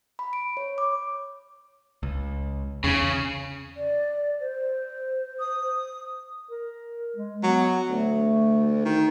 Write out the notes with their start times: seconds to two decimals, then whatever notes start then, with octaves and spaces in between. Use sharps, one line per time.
0.19 B5
0.33 D7
0.57 C#5
0.78 D6
2.03 C#2
2.84 E2 C#3 C#4
3.77 D5
4.40 C5
5.39 D#6
6.50 A#4
7.16 G#3
7.43 F#3 B3
7.90 D2 A3
8.85 D#3